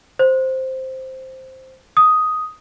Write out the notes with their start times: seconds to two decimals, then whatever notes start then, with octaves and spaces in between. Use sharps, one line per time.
0.19 C5
1.97 D#6